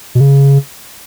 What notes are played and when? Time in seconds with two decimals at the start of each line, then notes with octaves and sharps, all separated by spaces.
0.15 B2
0.20 C#3